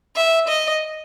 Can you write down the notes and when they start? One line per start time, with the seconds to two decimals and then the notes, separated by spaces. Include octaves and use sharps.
0.16 E5
0.48 D#5